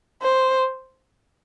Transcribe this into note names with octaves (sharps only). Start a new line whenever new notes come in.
C5